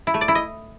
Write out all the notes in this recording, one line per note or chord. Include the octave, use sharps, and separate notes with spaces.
E4
A3
D5
E4
D#5